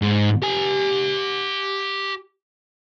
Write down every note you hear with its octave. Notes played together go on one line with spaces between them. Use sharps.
G#2
G4 G#5